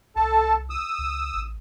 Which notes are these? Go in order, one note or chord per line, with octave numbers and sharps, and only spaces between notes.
C2 A4 A5
D#6 E6
C#2
A1